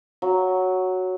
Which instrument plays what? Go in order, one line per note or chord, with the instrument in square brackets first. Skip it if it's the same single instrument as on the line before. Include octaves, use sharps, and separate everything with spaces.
[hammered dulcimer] F#3